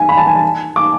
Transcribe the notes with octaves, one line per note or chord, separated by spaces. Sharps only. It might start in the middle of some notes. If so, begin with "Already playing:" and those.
Already playing: G#5
B5
A5
G#5
A5
D6